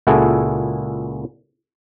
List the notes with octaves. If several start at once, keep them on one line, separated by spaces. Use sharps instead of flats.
C#2 A#2 E4 F#4 G#4 A4